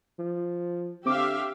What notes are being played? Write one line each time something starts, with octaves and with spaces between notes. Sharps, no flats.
F3
D3 C4 G4 E5 F5 D6